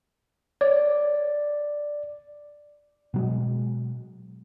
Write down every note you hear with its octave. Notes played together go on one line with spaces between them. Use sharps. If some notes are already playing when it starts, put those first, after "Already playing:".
C#5 D5
B2 F#3 G#3